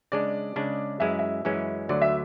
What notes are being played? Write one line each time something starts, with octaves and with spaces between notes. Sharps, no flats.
C#3 G#3 D4 D5
C#3 G#3 D4
F#2 E3 G#3 C#4 E4 E5
E5
F#2 E3 G#3 C#4 E4
D2 D3 F#3 D5
E5